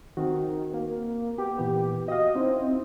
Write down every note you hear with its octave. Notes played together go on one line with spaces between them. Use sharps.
D#3 C4 F#4
A#3
B3 G4
A#2 E3 B3
F#4 D#5 F5
C4 C#4 D#4 E4